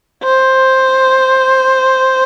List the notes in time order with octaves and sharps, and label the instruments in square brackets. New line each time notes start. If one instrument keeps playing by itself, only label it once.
[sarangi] C5